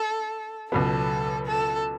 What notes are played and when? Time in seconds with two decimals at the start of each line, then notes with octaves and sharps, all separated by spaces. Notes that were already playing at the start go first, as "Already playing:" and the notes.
Already playing: A4
0.71 C#2 B2 F#3 B3 A4
1.46 A4